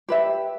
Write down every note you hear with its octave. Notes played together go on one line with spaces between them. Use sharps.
G4 B4 E5